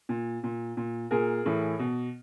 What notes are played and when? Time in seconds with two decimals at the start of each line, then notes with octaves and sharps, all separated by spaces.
0.09 A#2
0.44 A#2
0.77 A#2
1.11 A#2 G#4 A#4
1.46 A2 E3
1.79 B2